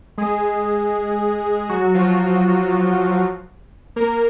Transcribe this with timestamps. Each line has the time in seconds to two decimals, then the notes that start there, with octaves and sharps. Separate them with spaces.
0.18 G#3 G#4
1.69 F#3 F#4
1.94 F3 F4
3.96 A#3 A#4